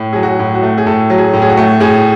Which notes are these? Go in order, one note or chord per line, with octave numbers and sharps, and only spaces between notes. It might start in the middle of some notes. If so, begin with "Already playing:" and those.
Already playing: A2
F#3 G#4
F#4
A2
F#4
A3
G#4
A2 A4
F#3
G#4
A2
G#4
F#4
A3
A2 G#4